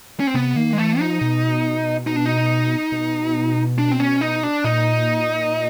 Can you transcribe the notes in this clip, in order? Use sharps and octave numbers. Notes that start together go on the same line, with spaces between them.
C#4
C4
C3 B3
D#3 A#3
G#3
E3 A3
F3 D#4
B2
D#4
D4
D#4
B2
D4
C4
C#4
D#4
D4
A#2 D#4